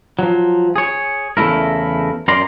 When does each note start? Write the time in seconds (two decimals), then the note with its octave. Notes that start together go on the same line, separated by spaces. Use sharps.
0.19 F3 F#3
0.76 G#4 C#5
1.37 E2 C#3 A3 E4 A#4
2.28 F#2 A#4 D5 A#5 C6